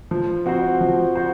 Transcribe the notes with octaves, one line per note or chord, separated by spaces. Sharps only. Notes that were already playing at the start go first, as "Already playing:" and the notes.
F3
C4 F#4 C5
F3
F#4 C5